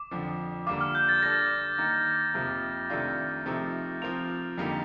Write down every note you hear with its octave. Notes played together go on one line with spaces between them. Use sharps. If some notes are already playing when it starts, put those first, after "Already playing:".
Already playing: D6
F2 D3 F3
D3 G3 A#3 F4 D6
F6
G6
A6
G3 D4 A4 A#6
D#3 A#3 D#4
F2 C3 F3 A#3
C3 D#3 A3 D4 F4
C3 F3 A3 D#4
F3 C4 F4 A#4 F7
F2 D3 G3 A#3 D#4